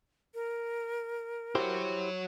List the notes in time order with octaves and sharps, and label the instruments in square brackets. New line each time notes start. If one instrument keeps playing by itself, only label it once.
[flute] A#4
[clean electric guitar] E4 G4 C5 [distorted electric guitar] F#4 C#5